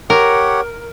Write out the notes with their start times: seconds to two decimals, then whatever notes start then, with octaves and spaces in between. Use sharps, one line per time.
0.10 G4 A#4 C#5 F#5